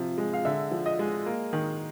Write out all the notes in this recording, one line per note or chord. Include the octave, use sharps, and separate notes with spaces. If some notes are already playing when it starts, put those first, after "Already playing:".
Already playing: C3 F3
G#3
F5
D3 E5
F3
D#5
G#3
A#3
D#3